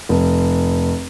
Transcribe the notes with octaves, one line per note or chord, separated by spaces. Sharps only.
F1